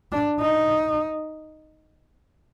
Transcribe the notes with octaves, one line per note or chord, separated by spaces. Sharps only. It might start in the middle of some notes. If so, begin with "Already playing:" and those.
D4
D#4